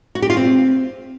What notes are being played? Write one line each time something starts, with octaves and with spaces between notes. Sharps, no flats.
F#4
G4
F4
C4